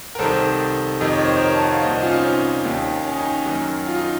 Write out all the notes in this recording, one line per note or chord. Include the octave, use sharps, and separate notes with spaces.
A#4
C2 C3 D#3 A4 C5
F2 C3 D#3 D#5
C#5
C5
A#4 C#5
A5
F#5
F5
C2 A#2 C5 D#5
C#4 F4
C4 D#4
C#4
D#2 D#3
C#4
D#4
C#4
F#2 D#3
F4
D#4